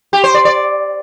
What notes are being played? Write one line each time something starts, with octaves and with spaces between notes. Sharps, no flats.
G4
C5
D5
D5